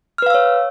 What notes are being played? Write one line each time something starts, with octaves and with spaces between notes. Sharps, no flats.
B4 C#5 F5 E6 F6